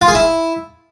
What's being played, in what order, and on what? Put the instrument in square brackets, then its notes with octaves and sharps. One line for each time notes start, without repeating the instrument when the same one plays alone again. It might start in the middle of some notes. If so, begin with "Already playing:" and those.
[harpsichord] F4
G#4
E4